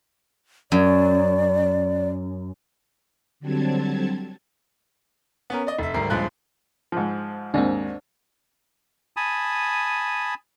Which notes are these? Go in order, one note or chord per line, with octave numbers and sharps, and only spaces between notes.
F#2 D5
D3 F#3 G3 C4 A5 G#6
B3 C#4 A#4
D5 D#5
F1 E5
G#1 D2 G3 A#4 C7
D#1 G2 F3 G#3 F#6
G#2 F3
D#2 G#2 C4 D4
G#5 A5 B5 D#6